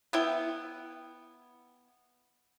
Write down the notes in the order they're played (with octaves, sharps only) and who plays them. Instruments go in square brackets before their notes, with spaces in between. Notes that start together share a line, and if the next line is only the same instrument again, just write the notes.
[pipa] B3 E4 G5